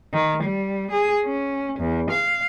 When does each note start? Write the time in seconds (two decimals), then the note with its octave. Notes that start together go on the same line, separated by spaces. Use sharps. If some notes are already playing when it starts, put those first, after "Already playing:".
0.13 D#3
0.42 G3
0.90 G#4
1.24 C#4
1.79 E2
2.10 F5